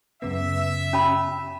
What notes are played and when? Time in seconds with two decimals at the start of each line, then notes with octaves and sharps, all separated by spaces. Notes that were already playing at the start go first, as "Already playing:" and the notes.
0.22 F#2 C#3 B3 E5
0.93 C#4 A5 B5